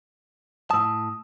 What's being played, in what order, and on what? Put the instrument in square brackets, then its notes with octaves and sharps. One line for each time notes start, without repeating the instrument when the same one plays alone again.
[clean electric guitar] A2 A5 [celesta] D#6 E6